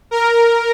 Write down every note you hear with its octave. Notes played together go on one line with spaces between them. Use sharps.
A#4